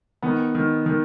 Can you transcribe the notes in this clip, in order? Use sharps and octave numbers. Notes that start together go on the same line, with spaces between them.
D#3 B3
D#3
D#3